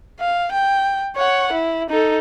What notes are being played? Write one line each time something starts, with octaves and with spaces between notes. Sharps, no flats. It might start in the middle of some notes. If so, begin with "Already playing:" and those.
F5
G5
C#5 F#5
E4
D#4 A4